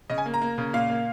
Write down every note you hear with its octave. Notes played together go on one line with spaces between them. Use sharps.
C#3 D#5
G#5
A#3
A#5
A#3
C#3
A#2 F5
A#3